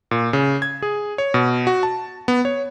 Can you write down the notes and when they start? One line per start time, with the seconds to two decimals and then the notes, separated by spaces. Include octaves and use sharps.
0.11 A#2
0.33 C#3
0.62 G#6
0.82 G#4
1.18 C#5
1.34 B2
1.67 F#4
1.83 A5
2.28 B3
2.45 C#5